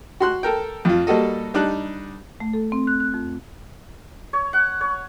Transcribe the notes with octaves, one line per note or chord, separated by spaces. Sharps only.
F#4 C6 F#6
A4 A#4 G5
F2 F4
G3 A#3 F#4 A4 D#5
G3 D4 D#4 F#6
A3
A4
C4
F#6
F#6
F2
C#5
F#5
C#5